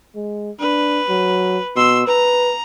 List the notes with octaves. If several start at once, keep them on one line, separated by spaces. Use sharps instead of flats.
G#3
D4 B4
F#3
B2 C6 E6
B4 A#5